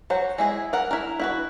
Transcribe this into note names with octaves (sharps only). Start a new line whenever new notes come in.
F#3 F#4 C5
G#3 E4 G#4
A#4 F#5
E4 A#4
E4 F#4 B4